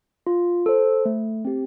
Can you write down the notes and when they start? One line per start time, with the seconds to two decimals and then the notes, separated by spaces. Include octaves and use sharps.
0.27 F4
0.66 A4 C5
1.05 A3
1.45 C4 G4